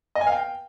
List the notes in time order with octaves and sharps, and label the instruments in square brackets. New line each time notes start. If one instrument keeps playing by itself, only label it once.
[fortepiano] D#5
G#5
F5
G5